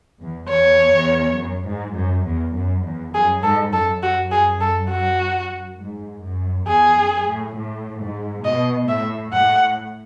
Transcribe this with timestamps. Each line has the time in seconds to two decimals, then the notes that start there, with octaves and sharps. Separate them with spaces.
0.20 E2
0.49 E2 C#5
0.93 E2
1.37 F#2
1.66 G#2
1.96 F#2
2.26 E2
2.55 F#2
2.85 E2
3.14 F#2 G#4
3.43 G#2 A4
3.73 F#2 A4
4.03 F#2 F#4
4.32 G#4
4.61 A4
4.91 F#4
5.80 G#2
6.23 F#2
6.67 E2 G#4
6.97 F#2
7.27 A2
7.56 A2
8.00 G#2
8.44 B2 D#5
8.89 A2 E5
9.32 A2 F#5